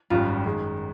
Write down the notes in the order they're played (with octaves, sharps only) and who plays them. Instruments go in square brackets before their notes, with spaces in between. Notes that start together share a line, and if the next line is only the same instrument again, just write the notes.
[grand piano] G#1 F#2 D#3 G3 [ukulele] F4
[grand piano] F#2 D#3 G#3